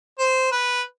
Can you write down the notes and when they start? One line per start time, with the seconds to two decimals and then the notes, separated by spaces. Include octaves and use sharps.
0.19 C5
0.51 B4